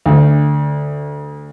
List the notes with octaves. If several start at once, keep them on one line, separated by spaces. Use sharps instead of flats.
D2